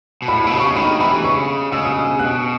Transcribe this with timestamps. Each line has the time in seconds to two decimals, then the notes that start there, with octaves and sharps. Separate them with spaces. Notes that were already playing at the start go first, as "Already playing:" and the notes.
0.22 B2
0.28 A2 B5
0.44 B2 B5
0.53 C#3
0.60 C#6
0.76 D#3 B5
1.00 E3 B5
1.24 C#3 C#6
1.72 C#3 E6
1.85 D#6
1.99 E6
2.19 B2 F#6